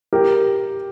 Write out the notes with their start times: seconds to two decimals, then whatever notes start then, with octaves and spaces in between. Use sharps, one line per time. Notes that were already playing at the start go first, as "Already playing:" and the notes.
0.13 G4 A#4